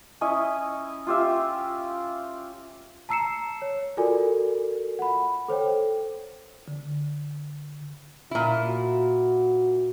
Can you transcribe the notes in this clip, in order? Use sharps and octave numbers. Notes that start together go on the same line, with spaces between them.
C#4 E4 D#5
F4 G4 E5
A5 A#5 E6 C7 C#7 E7
C#5
F4 F#4 A4 A#4 D5 G#5
F#5 B5
A4 C5 C#5 G5
D3
A#2 E4 F4
F#4